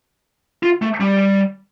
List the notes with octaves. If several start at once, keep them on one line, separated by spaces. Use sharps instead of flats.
F4
A3
G3